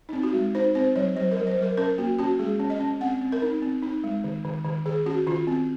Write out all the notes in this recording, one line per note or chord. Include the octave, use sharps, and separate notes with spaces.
C4 D#4
F#4
G#3
D#4 C5
C4 C5
F#3 C#5
F#3 C5
A#4
F#3
C5
F#3
A#4
C#4 A#4
A#3 F#4
C#4 F#4
G#3 G#4
C#4
D#5
C#4
C4 F#5
C4
A#4
D#4
C4
D#4
G#3
D#3
D#3
D#3
D#3 G#4
C#4 F#4
D#3 F4
C4